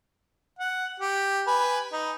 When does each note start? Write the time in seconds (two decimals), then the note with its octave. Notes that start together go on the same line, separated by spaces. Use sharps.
0.59 F#5
1.00 G4
1.47 B4 G#5
1.92 D#4